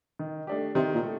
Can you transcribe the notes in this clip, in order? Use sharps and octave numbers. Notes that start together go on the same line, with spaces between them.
D#3
A3 D4 G4
C3 D#3
A#2
A3